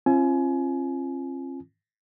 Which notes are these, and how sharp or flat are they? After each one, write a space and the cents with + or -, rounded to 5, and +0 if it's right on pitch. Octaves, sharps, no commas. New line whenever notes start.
C4 +45 F4 -30 G#5 +25